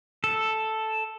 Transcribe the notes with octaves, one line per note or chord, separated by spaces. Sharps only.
A4